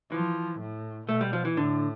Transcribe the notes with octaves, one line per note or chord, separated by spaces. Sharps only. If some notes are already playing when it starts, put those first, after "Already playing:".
E3 F3
A2
B2 A3
G3
F3
E3
A2 D3